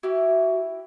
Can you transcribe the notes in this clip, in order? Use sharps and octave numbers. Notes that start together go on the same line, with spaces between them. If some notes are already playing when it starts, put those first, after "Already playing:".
E4 F#4 G4